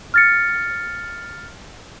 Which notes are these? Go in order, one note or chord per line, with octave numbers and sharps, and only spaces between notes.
F6 A6 C#7